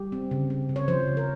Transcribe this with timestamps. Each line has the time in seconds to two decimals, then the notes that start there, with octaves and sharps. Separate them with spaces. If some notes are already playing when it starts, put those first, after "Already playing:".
Already playing: G3 G4
0.12 C4
0.31 C#3
0.50 C4
0.69 C#3
0.76 C#5
0.88 F3 C5
1.07 C#3
1.17 A#4